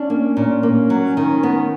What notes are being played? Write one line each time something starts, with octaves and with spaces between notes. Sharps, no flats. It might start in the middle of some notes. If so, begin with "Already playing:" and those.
Already playing: C#4 D4
A#3
A#2 C#4
A#3
F#3
D#3
B3